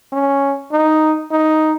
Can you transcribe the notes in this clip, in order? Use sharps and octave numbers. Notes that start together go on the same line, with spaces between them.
C#4
D#4
D#4